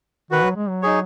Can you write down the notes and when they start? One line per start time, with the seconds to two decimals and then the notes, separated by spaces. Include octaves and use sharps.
0.31 D#3 F#4 B4 F#5
0.44 F#3
0.56 G#3
0.69 F#3
0.82 D#4 G#4 C#5